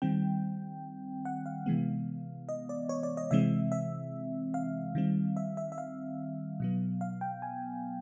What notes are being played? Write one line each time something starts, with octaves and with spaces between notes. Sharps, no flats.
D#3 G3 C4 G5
F#5
F5
C3 E3 G#3 B3
D#5
D5
C#5
D5
D#5
C3 E3 G#3 C4 E5
E5
F5
D#3 G3 C4
E5
E5
E5
F5
B2 F#3 B3
F5
G5
G#5